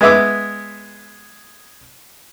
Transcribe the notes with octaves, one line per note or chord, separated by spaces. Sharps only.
G#3 B3 E5 D6 E6